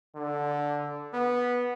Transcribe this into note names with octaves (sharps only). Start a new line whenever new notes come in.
D3
B3